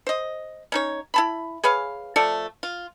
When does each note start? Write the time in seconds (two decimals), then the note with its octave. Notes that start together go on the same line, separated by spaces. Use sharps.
0.07 C5 D#5
0.72 C#4 D#4 C#5
1.14 E4 A5 B5
1.64 G#4 B4 C#5 F5
2.16 F3 A3 A4 D5
2.63 F4